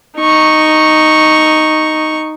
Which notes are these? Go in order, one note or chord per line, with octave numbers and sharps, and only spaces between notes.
D#4 C#6